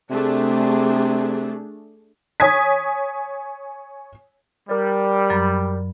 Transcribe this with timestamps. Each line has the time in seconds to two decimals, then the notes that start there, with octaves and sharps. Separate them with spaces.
0.10 C3 A3 D4 G#4
2.40 C#5 G#5 D#6 G#6 B6
4.69 G3 A#4 D5
5.30 F#2 F#3 B5